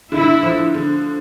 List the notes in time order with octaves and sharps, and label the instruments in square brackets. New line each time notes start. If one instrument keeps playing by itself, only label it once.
[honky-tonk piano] D3 [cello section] E4
[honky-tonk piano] F3
D3